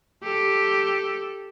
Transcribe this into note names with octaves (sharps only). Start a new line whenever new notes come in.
G4 A4